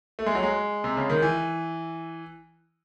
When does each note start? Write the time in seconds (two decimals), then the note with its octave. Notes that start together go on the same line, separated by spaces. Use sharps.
0.19 A3
0.26 G#3
0.35 F#3
0.43 G#3
0.84 C3
0.97 C#3
1.10 D#3
1.22 E3